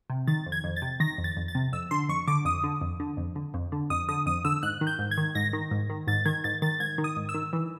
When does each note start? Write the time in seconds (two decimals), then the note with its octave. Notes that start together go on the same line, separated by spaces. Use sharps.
0.10 C3
0.27 D#3 A6
0.46 F2
0.52 G#6
0.64 F2
0.76 A6
0.82 C3
1.00 D#3 A#6
1.18 F2
1.24 A6
1.37 F2
1.48 A6
1.55 C3
1.73 F2 E6
1.91 D3 C6
2.09 F2 C#6
2.28 D3 D6
2.45 F2 D#6
2.64 D3
2.81 F2
3.00 D3
3.17 F2
3.36 D3
3.54 F2
3.72 D3
3.90 F2 D#6
4.08 D3 D#6
4.26 F2 D#6
4.45 D3 E6
4.63 G#2 F#6
4.81 D#3
4.87 G6
4.99 G#2
5.11 G#6
5.18 D#3
5.35 G#2 A#6
5.53 D#3
5.71 G#2
5.90 D#3
6.07 G#2 A6
6.25 D#3 G#6
6.44 G#2 A6
6.62 D#3 A6
6.80 G#2 G#6
6.98 D#3
7.04 D#6
7.16 G#2
7.29 E6
7.34 D#3
7.53 E3